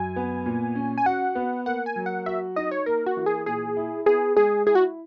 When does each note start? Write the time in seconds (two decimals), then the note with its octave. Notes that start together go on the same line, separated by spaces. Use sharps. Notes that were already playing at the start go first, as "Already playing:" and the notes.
Already playing: F#2 G#5
0.16 B3
0.46 A#2
0.75 C#4
0.98 G#5
1.05 F#4 F#5
1.35 B3
1.66 A#3 F#5
1.86 G#5
1.96 F#3
2.06 F#5
2.26 F#4 E5
2.56 D#4 D#5
2.71 C#5
2.86 A#3 A#4
3.06 F#4
3.17 E3
3.26 G#4
3.46 A#2 G#4
3.77 E4
4.06 B3 G#4
4.36 G#3 G#4
4.66 E4 G#4
4.75 F#4